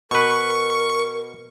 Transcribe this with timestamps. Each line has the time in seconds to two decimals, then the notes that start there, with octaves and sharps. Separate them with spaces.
0.11 B2 A#4 B4 C#6